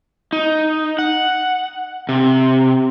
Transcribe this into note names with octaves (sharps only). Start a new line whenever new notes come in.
D#4
F#5
C3